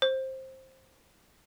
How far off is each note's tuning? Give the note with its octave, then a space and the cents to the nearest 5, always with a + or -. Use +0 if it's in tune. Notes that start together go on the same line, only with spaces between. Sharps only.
C5 +15